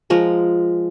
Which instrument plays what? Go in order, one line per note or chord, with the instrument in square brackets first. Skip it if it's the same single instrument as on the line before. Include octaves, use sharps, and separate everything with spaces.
[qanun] F3 G#3 A#4